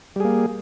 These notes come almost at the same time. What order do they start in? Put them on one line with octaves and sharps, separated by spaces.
G3 G#4 A#3